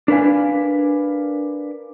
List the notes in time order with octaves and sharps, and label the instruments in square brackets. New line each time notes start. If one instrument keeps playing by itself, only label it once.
[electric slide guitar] D4 A#4 B4 F5 G#5